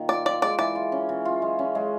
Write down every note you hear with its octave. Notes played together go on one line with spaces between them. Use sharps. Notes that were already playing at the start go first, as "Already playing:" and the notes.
Already playing: A#2 D#3 A#3
F4 D5
F4 D5
G#3 D5
E3 D5
F4
C#4
E3
F4
G#3
C#4
G#3